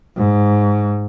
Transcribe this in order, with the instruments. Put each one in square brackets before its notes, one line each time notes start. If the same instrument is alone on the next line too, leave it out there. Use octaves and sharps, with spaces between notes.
[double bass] G#2